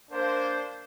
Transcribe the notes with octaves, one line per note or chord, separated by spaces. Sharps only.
A#3 D4 A#4 C5